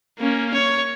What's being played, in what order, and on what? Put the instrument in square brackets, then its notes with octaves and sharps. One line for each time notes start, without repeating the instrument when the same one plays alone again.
[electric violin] A#3 C#4
C#5